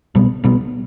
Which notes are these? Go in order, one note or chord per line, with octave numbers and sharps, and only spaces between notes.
B1 B2 G3 B3
B1 B2 G3 B3